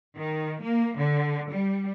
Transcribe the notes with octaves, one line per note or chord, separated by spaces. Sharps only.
D#3
A#3
D3
G3